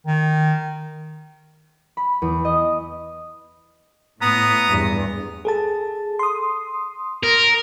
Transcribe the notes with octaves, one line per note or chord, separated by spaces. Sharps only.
D#3
B5
E2
D#5
A2 B3 A#5 D#6
E2 G2
G#4 A4 A5
C6 D#6
A#4